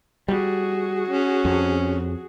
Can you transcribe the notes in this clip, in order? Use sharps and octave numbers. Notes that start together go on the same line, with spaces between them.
G3 F#4 G#4
C#4
F2